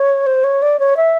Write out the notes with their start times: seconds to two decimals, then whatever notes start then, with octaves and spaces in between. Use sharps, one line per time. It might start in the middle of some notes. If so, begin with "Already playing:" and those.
Already playing: C#5
0.26 C5
0.44 C#5
0.62 D5
0.80 C#5
0.97 E5